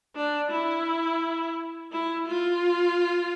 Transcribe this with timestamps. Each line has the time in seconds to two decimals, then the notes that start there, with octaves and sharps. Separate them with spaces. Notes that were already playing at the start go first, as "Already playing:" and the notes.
0.16 D4
0.51 E4
1.92 E4
2.27 F4